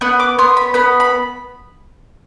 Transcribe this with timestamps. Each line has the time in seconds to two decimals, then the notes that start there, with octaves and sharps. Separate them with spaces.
0.01 B3 F#5
0.20 D6
0.39 B3 C6
0.57 B5
0.74 B3 B5
1.00 B5